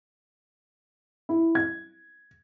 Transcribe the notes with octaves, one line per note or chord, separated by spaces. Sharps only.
E4
G#6